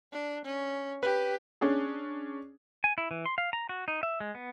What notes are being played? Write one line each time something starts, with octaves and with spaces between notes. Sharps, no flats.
D4
C#4
G4 B4
C#4 D4 G#4
G#5
E4
E3
C6
F5
A#5
F#4
D#4
E5
G#3
B3